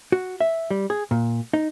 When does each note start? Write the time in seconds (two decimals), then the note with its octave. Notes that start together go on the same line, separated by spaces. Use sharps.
0.12 F#4
0.41 E5
0.71 G3
0.90 G#4
1.11 A#2
1.53 D#4